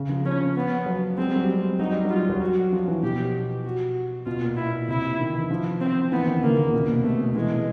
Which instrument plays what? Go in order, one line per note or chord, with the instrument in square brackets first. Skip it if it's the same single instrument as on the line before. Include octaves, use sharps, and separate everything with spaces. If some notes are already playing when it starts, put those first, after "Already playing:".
Already playing: [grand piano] C#3
F3
[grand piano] F3 [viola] C#4
[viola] B3
[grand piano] F#3
[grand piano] G#3 [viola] C4
[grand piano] G3
F#3
G3
[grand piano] F#3 [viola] D#4
[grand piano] G3
F#3
[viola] F4
[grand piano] G3
F#3
[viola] F#4
[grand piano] F3
E3
[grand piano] B2 [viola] G4
[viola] F#4
[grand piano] B2 [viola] F4
[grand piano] A#2
[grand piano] A#2 [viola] E4
[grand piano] C3 [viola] E4
[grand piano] D#3
E3
F3
[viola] C4
[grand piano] E3 [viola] B3
[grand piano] E3
D#3
[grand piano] C#3 [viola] A#3
[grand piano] D3
C#3
A#2
B2
C3
[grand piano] B2 [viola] A3
[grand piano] B2
[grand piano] E3 [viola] G#3